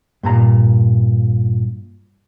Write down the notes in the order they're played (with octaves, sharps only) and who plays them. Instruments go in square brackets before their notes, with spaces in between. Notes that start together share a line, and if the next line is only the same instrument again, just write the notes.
[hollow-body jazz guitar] G2 A#2 A#5